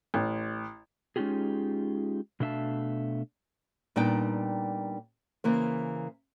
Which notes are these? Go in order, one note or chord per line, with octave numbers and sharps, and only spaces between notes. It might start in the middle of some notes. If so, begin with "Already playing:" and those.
A1
G#3 C#4 D#4 F4 G4 G#4
B2 A3 D4 E5 F5 A5
A#2 G3 B3 D4 D#4 G5
C#3 E3 A#3 C5